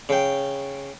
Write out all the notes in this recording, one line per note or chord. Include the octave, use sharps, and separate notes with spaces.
C#3 G5